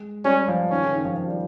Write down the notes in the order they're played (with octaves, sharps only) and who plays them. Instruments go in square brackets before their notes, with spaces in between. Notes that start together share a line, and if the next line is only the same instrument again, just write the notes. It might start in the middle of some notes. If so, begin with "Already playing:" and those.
Already playing: [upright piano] G#3
[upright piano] G3 [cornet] C#4
[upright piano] F3
[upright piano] D#3 [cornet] C#4
[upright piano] C#3
D#3
F3
F3
G3